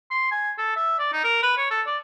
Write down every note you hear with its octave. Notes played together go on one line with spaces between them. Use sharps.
C6
G#5
A4
E5
D5
D#4
A#4
B4
C#5
A4
D5